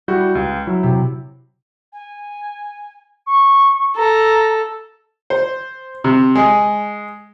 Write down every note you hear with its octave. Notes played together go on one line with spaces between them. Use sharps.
G3 E4 F#4 G6
C#2
F#3 E4
C3
G#5
C#6
A4 A#5
C5
C3
G#3